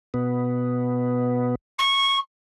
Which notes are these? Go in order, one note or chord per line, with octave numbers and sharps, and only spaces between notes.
B2 B3
C#6